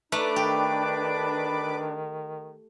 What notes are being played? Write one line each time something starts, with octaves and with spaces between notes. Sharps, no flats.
A3 D4 D#4 B4 D6
D#3 G4